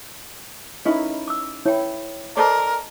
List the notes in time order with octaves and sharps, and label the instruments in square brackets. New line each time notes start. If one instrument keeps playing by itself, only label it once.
[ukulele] C#4 B4 [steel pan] D#4 E4 D#5
[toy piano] D6 E6
[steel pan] E4 [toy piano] C#5 G5
[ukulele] A4 C5 D5 [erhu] A#4 [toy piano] D#5 A5 D6